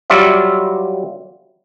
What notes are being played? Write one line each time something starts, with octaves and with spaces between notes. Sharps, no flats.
F#3 G3 F4 D5 E5